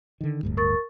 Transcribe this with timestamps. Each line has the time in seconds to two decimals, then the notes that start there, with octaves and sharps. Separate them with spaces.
0.21 D3 D#3
0.43 D1 D2 G2
0.57 A#4 C#6 A6